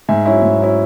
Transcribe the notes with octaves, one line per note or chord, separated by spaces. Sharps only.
G#2 E5 G#5
F#3 C#4 E4
G#2
F#3 C#4 E4